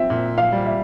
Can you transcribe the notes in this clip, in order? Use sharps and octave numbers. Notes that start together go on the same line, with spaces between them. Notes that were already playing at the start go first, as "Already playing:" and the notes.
Already playing: C4 E5
A#2
F5
G3
E5